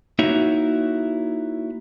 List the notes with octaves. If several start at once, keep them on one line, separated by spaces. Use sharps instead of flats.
A#3 D#4 E4 F#4 C#5 E5